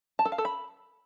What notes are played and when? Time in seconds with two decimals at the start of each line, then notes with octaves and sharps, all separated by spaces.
0.19 A5
0.25 A4
0.32 F5
0.38 A4
0.45 B5